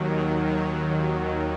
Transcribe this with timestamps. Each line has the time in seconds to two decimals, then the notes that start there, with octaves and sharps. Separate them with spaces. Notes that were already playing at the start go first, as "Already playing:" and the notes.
Already playing: D#2 D#3 F#3
0.11 A#4
0.45 C#5